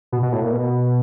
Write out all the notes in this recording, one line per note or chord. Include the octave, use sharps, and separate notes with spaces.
B2
B2
A2
A#2
B2